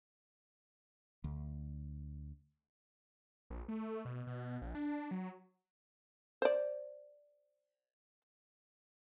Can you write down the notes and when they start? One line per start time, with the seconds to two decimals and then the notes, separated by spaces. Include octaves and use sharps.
1.24 D2
3.50 A#1
3.68 A3
4.05 B2
4.27 B2
4.62 A#1
4.75 D4
5.11 F#3
6.42 C5 D5